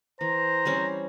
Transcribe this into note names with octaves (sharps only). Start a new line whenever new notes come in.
E3 C5 A#5
G3 C4 C#4